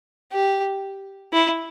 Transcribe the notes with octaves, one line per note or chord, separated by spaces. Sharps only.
G4
E4